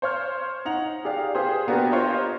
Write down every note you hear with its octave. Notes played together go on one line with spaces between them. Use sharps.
C5 C#5 F6
D#4 F#5 F7
G4 G#4 D5 F5
G4 G#4 B4 C5
A#3 B3 D4 F#4 G4 A#4
F4 G4 C5 C#5 D#5